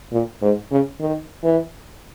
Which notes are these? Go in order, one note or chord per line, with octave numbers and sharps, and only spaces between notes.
A#2
G#2
C#3
D#3
E3